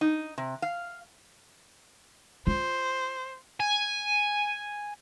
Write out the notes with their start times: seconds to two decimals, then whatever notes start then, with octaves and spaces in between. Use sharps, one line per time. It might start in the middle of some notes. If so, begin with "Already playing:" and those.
0.01 D#4
0.38 C3
0.62 F5
2.47 F4 C5
3.60 G#5